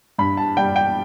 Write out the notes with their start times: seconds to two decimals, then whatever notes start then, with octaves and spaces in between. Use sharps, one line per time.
0.18 G2 B5
0.37 A5
0.57 G3 G5
0.76 G5